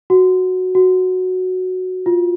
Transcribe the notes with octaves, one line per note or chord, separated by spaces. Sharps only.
F#4
F#4
F4